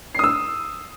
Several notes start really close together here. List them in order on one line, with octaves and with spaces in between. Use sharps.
C7 D#6 E6